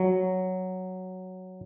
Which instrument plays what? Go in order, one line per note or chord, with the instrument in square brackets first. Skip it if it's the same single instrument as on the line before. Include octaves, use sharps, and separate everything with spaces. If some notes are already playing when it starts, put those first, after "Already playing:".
Already playing: [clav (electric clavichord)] F#3